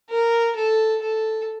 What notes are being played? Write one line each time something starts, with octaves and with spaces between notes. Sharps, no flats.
A#4
A4
A4